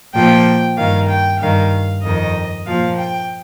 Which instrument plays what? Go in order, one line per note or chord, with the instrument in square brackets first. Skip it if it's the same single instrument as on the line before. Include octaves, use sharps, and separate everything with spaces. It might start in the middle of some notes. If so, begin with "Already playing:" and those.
[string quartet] A#2 F3 G5
G2 D#3 F5
G5
G2 D#3 F5
F2 D#3 D#5
A#2 F3 F5
G5